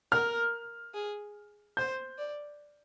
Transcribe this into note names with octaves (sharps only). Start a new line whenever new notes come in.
A#4 F6
G#4
C5 G6
D5